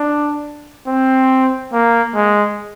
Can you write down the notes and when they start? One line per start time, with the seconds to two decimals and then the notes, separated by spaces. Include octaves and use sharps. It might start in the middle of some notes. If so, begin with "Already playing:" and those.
Already playing: D4
0.88 C4
1.73 A#3
2.15 G#3